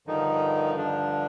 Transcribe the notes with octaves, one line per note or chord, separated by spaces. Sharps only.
G2 D3 D#3 F3 D#4
D3 D4